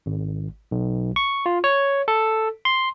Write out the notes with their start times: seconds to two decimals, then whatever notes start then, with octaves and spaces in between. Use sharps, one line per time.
0.06 G#1
0.71 B1
1.16 C#6
1.46 F4
1.64 C#5
2.08 A4
2.65 C6